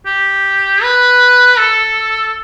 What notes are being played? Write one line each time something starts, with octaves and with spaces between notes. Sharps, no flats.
G4
B4
A4